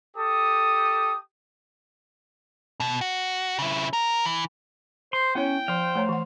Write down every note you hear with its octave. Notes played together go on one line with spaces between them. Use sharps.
G4 A4 D#6
B2
F#4
C#3 E4
A#4
E3
C5 C6
B3 C#4 E4 C#5 G5
F3 C5 F5
A3 C#5 A#5
E3 F#5